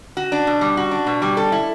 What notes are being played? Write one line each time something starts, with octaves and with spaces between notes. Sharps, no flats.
F#4
D4
B2
G3
F#4
D4
B2
G3
A4
E4